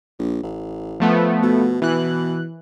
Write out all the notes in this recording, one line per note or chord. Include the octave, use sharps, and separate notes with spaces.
A#1
A1
F3 A3 B3
B2
B2 E3 F#6